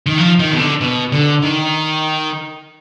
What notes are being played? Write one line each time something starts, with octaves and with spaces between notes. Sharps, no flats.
D#3
F3
D#3
B2
D3
B2
D3
D#3